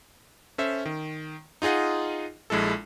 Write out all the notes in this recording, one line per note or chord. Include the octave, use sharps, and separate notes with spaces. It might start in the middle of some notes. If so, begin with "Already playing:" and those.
C#4 A4 C5 E5
D#3
D#4 F4 G#4 D#5 F#5
A#1 G#3 E4 A4